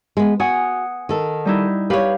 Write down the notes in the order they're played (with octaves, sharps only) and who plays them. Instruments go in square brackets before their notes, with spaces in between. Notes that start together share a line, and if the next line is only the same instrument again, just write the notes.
[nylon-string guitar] G#3 B3
[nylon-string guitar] F#4 [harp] F#5 G#5 D#6
[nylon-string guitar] D#3 A4
[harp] G3 D#4 E4
[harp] G4 F5 [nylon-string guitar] B4 C#5